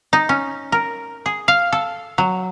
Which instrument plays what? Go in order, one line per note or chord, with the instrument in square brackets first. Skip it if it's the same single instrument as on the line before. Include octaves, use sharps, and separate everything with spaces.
[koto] D#4
C#4
A#4
G#4
F5
A4
F#3